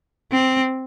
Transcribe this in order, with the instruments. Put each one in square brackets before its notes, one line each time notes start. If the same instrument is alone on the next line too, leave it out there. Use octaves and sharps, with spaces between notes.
[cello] C4